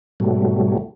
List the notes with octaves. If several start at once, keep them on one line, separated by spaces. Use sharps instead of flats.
G#2 B2 F#3 G3 A3